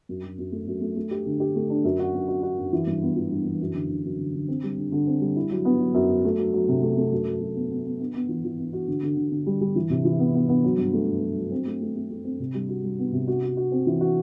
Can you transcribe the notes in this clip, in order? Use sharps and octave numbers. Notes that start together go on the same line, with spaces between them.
F#2
F#3
F#2
A3
F#2
A3
A3
G4
D3
G4
A3
D4
F#2
F#4
F#2
F#4
F#4
F#2
E3
G2
B3
E3
G2
E3
F#2
D3
D3
F#2
D3
D3
C4
G3
D3
D3
C4
G3
E4
F#3
B3
F#3
F#2
F#3
A3
F#3
F#3
C3
A3
A3
F#2
F#3
F#2
B3
B3
B3
B3
B3
E3
E3
B3
F#4
D3
D3
D3
D3
G3
G3
E3
C3
E3
B3
B3
B3
F#3
G2
A3
G2
F#3
F#3
C4
A3
A3
A3
A3
C4
C3
G3
F#4
G3
B3
C3
F#4
F#4
F#4
C4
E3
F#4